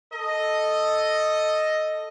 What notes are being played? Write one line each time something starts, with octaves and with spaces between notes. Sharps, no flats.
A4 D#5